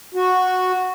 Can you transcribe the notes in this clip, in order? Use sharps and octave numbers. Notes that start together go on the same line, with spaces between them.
F#4